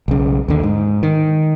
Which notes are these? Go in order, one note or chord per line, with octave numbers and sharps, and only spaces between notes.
B1 C#3
D#2 D3
G#2
D#3